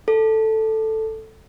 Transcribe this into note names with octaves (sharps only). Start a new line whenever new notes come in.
A4